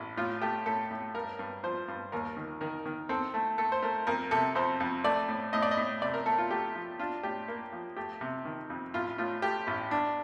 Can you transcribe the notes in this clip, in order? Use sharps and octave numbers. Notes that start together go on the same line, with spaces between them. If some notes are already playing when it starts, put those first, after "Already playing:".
Already playing: A1
A2 F4
A3 G4
A2 A4
A2
G2 A#4
G2
F3 C5
G2
D#2 A#4
D#3
D#3 A#4
D#3
C4 A4
A3
A3 A4
C5
A3 A#4
F2 A#4
C3 A4
F2 C5
F2
A3 D5
A2
A2 D#5
D5
D#5
A2
C3 D5
A#4
A3 A4
F4
A3 G4
F3
D4 F4
A2 G4
A#3
F3
A3 G4
C3
D#3
F2
A1 F4
A2 F4
A3 G4
A1
D4